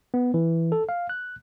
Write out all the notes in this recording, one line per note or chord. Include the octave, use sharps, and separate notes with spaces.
B3
E3
A4
F5
F#6